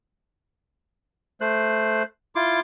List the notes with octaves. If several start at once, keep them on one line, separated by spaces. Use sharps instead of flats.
A3 C5 F#6
E4 F4 C6 D6